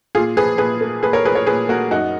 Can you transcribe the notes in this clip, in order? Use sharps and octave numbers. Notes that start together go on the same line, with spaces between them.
A#2 F4 G#4
F3 G#4 B4
A#2 G#4 B4
A#3
A#2 G#4 B4
A#4 C#5
F3 G#4 B4
A#4 C#5
A#2 G#4 B4
A#3 F#4 A#4
F#2 D#4 F#4